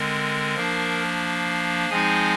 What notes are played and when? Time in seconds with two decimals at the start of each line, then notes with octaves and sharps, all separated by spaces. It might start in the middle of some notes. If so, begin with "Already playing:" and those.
Already playing: D3 G#3 C4 A#4
0.56 F3 A#3 D4
1.89 F3 G#3 C4 D#4 G#4 G#5